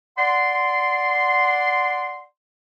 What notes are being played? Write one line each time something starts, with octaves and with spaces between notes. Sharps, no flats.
D5 F#5 C6